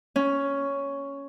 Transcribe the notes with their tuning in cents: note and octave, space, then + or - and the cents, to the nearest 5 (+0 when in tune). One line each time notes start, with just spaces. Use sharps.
C#4 +5